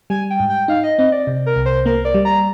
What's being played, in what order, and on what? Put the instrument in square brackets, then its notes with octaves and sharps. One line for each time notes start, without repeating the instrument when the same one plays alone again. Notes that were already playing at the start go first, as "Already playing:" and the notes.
[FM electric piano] G3 [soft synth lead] G#5
[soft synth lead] G5
[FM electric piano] G#2
[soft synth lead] G5
[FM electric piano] D#4 [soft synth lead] F5
[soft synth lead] D#5
[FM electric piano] C4 [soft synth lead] D#5
[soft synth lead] D5
[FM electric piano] C3
[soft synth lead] A#4
[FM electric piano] C2
[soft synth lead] C5
[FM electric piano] A#3 [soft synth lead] A#4
[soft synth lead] D5
[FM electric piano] G3
[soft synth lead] A#5